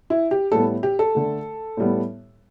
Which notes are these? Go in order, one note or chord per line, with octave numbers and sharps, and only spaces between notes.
E4
G4
A2 G3 B3 A4
G4
A4
D3 A3
A2 G3 B3